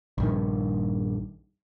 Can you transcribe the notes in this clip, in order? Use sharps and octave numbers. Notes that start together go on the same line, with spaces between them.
A#1 G2 D#3